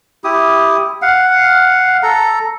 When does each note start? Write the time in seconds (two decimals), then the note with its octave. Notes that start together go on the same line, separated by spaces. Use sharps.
0.24 E4 G4 D#6
1.02 F5 F#5
2.03 A4 A#5